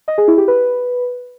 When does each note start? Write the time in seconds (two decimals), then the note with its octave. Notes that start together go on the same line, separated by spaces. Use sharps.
0.08 D#5
0.18 G#4
0.28 E4
0.38 G4
0.48 B4